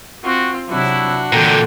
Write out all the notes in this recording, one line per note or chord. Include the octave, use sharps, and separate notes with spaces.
C4 F4 F#4
C3 F#3 D4 E4 F#4
A#2 D3 E3 A4 G5